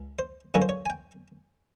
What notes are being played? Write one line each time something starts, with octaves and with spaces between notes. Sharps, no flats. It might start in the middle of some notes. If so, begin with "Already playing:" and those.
Already playing: C#2
C5
G2 D3 F#3 A#3 C#4 C#5
C5
C#5
G#5
G5